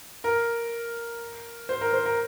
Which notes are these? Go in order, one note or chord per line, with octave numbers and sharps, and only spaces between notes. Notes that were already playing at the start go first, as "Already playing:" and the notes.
A#4
C5
A#4
C5
A#4